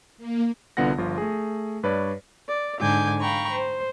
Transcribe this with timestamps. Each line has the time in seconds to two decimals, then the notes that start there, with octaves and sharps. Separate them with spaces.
0.18 A#3
0.77 C2 D3 B3 F4 F#5 A#6
0.98 G1 F3 F4
1.18 A3 G#4
1.83 G2 B4 C#5 D5
2.48 D5
2.80 G#2 D3 G#5 D6 G6
3.20 F5 G5 A#5 B5 C#6
3.51 C5